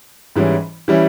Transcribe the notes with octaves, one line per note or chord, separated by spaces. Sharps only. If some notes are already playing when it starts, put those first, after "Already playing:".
G#2 E3 G3 C#4 E4
E3 G3 C#4 E4